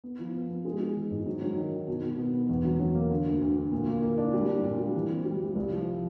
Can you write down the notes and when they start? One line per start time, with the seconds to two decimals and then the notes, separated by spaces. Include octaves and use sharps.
0.04 B3
0.19 F3
0.34 B3
0.50 B3
0.65 G#3
0.81 G#3
0.96 E3
1.11 G#2
1.26 F#3
1.42 F#3
1.57 D#3
1.72 D#3
1.88 B2
2.03 B2
2.19 B3
2.34 B3
2.49 E2
2.65 F#3
2.80 F#3
2.95 A#3
3.10 D3
3.25 D2
3.41 D2
3.56 D3
3.72 A#2
3.87 A#3
4.02 A#3
4.18 D4
4.33 G3
4.48 D4
4.64 A#2
4.79 G3
4.95 E3
5.10 C4
5.25 G3
5.40 G3
5.55 C2
5.71 F3